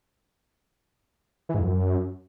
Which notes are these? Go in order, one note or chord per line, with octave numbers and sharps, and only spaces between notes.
E3
G#2
F2
F#2